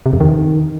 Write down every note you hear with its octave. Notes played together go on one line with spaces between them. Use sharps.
C3
F2
D#3